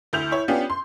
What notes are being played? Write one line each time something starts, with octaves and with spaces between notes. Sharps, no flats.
D2 E4 G6 F7
E4 C#5
B3 C#4 D4 F4 G4
C6